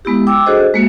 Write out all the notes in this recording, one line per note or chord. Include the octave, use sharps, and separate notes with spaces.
G#3 B3 E4 G4
G5 D6 E6
D4 F#4 G#4 A4 C5 D#5
G#3 A#3 F#4